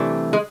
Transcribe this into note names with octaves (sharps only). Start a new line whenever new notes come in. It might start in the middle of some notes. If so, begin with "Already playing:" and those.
Already playing: C3 E3 G3 A3 D4
G#3